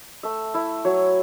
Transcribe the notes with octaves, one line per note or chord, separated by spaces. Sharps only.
A3 E5
E4 E5
F#3 C#5